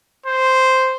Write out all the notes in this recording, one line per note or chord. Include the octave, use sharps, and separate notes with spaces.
C5